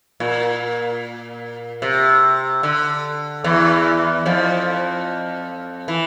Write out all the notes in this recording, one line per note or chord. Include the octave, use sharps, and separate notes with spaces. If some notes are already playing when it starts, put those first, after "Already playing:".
A#2
C3
D3
E2 E3
F2 F3
E3